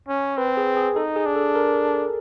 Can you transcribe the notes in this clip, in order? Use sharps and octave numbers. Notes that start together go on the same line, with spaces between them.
C#4
C4 B4
G#4
G#4
D#4 A4
G#4
D4
A4
A#4